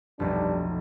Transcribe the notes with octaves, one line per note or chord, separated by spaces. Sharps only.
F1 B1 G2 D4